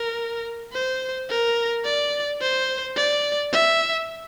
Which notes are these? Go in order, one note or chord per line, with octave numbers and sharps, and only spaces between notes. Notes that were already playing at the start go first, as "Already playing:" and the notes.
Already playing: A#4
C5
A#4
D5
C5
D5
E5